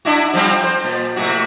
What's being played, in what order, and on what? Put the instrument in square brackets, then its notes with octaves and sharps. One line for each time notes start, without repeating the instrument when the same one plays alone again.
[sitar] D4 E4 F#4
F3 G3 C4
C5
A#2
A2 C3 F#4